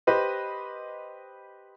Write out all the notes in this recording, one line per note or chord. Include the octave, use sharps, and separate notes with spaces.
G4 B4 C5 D#5